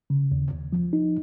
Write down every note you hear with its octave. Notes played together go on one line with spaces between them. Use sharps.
C#3
D#2
D#2
F3
D#4